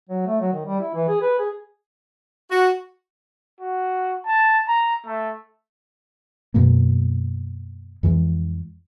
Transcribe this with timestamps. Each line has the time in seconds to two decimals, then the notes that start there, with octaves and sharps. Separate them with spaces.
0.09 F#3
0.26 A3
0.41 F#3
0.53 D#3
0.66 G3
0.80 E4
0.95 E3
1.08 G#4
1.22 B4
1.39 G#4
2.49 F#4
3.61 F#4
4.26 A5
4.68 A#5
5.06 A3
6.54 F#2 B2 G#3 A#3
8.03 F2 E3 G#3